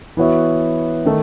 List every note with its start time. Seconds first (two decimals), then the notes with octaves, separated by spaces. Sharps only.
0.17 E3 B3 F#4 C#5 E5
1.05 D#3 A3